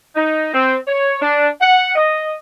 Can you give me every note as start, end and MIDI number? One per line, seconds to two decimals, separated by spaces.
0.16 0.50 63
0.54 0.76 60
0.87 1.16 73
1.21 1.47 62
1.61 1.92 78
1.95 2.33 75